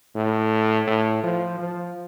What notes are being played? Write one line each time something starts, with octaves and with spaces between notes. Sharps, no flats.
A2
A2
F3
F3